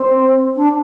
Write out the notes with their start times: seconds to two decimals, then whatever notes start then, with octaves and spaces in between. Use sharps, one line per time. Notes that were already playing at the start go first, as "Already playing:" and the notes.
Already playing: C4
0.55 D4